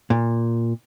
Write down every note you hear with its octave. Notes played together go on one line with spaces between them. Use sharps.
A#2